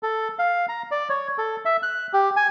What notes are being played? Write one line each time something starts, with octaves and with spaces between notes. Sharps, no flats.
A4
F5
A#5
D5
C#5
A4
E5
F#6
G4
G#5